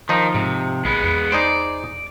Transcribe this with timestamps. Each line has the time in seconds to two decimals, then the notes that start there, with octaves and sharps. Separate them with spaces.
0.09 D#3 F3 D#4
0.34 G#2 C3
0.85 A#1 G#3 B3
1.04 E2
1.32 D#4 G#4 C5 D5